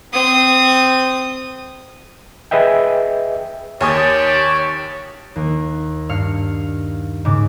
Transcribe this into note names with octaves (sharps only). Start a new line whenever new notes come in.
C4 D#6
G#4 B4 D#5 E5 G5
D#2 G4 C#5 D5 G#5 A5 D#6
D#2
G2 F5 F6 C#7
G#2 C#3 D6